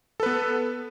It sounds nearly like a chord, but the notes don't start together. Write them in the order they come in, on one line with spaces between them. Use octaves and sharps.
A4 B4 B3